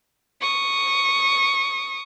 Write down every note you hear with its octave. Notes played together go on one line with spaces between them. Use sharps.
C#6 D#6